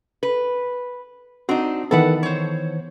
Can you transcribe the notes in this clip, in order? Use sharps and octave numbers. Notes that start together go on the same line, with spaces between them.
B4
C4 D4 D#4 F#4
D#3 E3 B3 A4 B4 F#5
C5 C#5